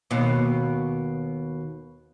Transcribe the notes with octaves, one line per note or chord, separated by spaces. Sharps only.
D#2 B2